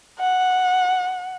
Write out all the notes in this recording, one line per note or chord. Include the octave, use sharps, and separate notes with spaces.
F#5